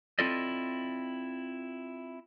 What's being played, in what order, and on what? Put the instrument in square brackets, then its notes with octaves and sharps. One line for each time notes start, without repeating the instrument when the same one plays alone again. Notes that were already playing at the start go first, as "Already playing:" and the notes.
[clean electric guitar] C4 E4 F4 A4 D5 D#5